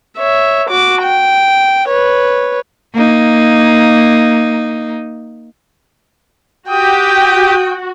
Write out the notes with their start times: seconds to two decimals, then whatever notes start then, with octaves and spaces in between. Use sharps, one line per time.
0.18 C#5 E5
0.70 F#4 D6
1.02 G5
1.88 B4 C#5
2.94 A#3 D#4
6.70 F#4 G4 G5 D#6